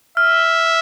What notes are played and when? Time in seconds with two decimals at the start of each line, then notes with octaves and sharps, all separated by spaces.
0.17 E5 F6
0.43 F6